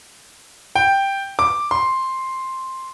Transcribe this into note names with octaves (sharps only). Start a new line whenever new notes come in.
G5
D6
C6